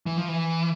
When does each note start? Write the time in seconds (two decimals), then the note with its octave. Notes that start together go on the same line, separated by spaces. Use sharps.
0.06 E3
0.17 F3
0.28 E3